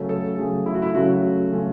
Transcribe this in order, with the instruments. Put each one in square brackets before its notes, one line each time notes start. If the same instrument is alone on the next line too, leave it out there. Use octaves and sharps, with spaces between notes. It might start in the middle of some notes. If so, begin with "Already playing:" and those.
Already playing: [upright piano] C#3 F#3 A3 C#4
[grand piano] A4
[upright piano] C#3 F#3 A3 C#4 [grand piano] G#4
[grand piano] E4
F#4
E4
[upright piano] C#3 F#3 A3 C#4 [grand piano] F#4
[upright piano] C#3 F#3 A3 C#4